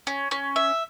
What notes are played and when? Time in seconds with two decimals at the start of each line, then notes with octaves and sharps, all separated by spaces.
0.07 C#4
0.31 C#4
0.56 E5